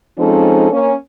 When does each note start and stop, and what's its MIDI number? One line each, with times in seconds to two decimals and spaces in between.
0.19 0.71 53
0.19 0.71 56
0.19 0.71 60
0.19 0.71 61
0.19 0.71 63
0.19 0.71 69
0.72 0.93 58
0.72 0.93 61